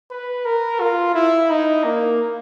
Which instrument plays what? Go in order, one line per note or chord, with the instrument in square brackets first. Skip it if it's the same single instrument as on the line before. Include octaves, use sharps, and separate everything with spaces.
[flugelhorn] B4
A#4
F4
E4
D#4
A#3